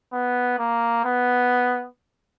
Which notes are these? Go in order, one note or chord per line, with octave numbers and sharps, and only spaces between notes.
B3
A#3
B3